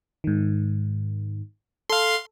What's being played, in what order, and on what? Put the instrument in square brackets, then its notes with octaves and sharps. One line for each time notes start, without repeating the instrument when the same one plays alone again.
[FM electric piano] G#2 D#3
[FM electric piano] A4 [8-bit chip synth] F5 C6